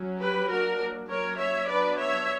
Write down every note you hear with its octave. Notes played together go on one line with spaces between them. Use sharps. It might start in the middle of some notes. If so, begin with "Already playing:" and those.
Already playing: F#3 C#4
G4 B4
F#3 A#3 D4 F#4 A#4
F#3 A#3 C#4 A#4 C#5
C#5 E5
F#3 B3 D4 B4 D5
C#5 E5